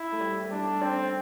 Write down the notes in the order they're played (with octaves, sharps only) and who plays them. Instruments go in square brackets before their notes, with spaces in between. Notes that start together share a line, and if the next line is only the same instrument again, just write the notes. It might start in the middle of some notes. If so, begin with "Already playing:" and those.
Already playing: [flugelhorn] E4
[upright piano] A3
G3
G3
[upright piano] A3 [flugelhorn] D4
[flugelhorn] C4 [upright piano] D4